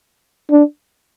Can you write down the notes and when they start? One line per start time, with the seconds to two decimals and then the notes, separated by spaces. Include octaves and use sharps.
0.50 D4